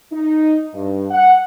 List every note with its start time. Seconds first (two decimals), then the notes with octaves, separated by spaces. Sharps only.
0.12 D#4
0.74 G2
1.10 F#5